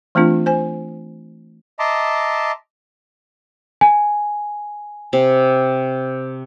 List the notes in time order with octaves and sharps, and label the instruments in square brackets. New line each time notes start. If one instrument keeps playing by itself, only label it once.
[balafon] E3 A3 C4 D4 F4
C5 G#5
[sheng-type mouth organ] D#5 E5 A5 A#5 C6 D6
[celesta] G#5
[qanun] C3